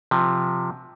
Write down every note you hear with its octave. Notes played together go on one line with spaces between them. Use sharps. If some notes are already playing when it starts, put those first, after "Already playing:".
C3 F3